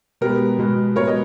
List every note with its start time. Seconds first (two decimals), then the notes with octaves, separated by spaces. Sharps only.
0.21 B2 G#3 B3 G4 A#4
0.59 B2 G#3 B3
0.96 B2 G#3 B3 A#4 C#5
1.07 D#5